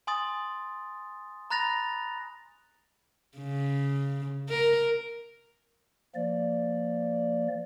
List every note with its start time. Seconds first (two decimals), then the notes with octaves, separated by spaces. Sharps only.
0.07 G#5 C6 D#6 A6
1.50 A#5 B5 F#6 A6 A#6 F7
3.38 C#3
4.49 A#4
6.15 F3 A#3 D5